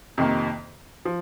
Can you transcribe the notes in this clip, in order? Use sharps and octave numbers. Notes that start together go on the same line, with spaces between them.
F2 C3 D#3 A#3
F3